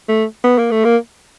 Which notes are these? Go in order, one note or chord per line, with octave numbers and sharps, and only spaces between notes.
A3
B3
A#3
A3
A#3